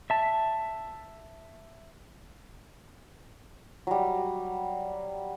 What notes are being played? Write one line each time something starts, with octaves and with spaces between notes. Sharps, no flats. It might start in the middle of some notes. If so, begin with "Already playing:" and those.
E5 A5
F#3 G3